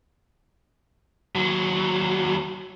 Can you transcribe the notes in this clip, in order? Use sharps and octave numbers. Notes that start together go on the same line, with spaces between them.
D#2 F#3